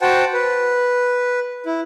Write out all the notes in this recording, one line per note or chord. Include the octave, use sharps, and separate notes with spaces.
F#4 C5 F#5 G5 A5
B4
E4